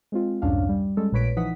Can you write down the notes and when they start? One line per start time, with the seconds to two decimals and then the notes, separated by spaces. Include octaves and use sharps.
0.12 G#3 C4 F4
0.42 C2 F2 G#2 C#4 D4 F5
0.69 G3
0.97 G3 G#3 C#4 A4
1.12 A#1 A#2 B4 C#5 B6 D7
1.36 E3 F3 D#4 F#5 D#6 B6